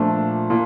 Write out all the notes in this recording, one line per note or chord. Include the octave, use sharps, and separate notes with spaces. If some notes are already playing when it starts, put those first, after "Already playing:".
Already playing: A#2 F3 A3 D4
A#2